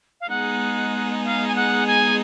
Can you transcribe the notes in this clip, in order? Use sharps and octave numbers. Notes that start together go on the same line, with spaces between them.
F5
G#3 B3 D#4 G#4 F#5
F5
G#5
F#5
G#5